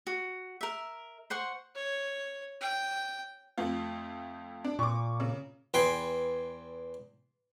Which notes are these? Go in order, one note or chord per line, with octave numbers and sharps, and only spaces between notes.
F#4
A#4 E5
C5 F#5 C6 C#6
C#5
G5
F2 A3 F4
D4
A#2 C#6 D6
C#3
E2 B4 G5 G#5 C6